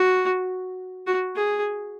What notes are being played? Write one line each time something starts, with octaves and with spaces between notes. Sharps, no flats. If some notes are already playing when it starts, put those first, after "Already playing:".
Already playing: F#4
F#4
G#4